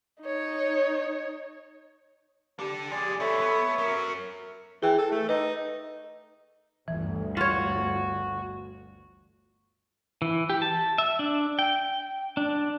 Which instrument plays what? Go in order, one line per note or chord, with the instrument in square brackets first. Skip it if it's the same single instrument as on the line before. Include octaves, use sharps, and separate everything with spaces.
[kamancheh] D#4 C#5
[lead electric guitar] D4 A4 [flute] G4
[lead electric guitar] F3 G#4 [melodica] D5
[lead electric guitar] D3 B3 [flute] A4 [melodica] C#5 E5
[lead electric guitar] B3
[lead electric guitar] F#3 C#4 [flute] A#4
[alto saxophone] E3 [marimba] G#4 G5
[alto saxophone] A4
A3
[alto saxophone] D#4 [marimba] B4
[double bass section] G1 D2 [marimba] E3
[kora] F4 C#5 [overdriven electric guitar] F#4
[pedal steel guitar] E3
G4
A5
E5
D4
G5
D4